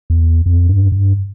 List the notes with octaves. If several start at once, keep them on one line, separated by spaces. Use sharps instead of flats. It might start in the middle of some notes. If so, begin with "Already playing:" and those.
E2
F2
G2
G2